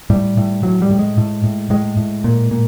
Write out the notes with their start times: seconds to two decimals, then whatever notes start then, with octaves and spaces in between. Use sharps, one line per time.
0.10 A2 G3
0.37 A2
0.63 A2 F#3
0.82 G3
0.91 A2
0.99 G#3
1.18 A2
1.44 A2
1.70 A2 G#3
1.97 A2
2.24 A#2
2.51 A#2